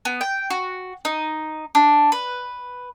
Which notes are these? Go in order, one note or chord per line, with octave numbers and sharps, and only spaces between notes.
B3
G5
F#4
D#4
D4
B4